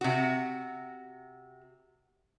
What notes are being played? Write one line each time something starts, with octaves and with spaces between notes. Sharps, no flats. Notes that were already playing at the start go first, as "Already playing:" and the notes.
C3 F#4